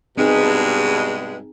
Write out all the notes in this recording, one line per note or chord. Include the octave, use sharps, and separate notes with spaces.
G2 B2 G#3 C4 D#4 G#4